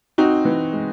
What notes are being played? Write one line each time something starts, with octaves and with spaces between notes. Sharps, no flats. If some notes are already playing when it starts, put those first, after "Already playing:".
C4 D#4 F#4
E3
G#3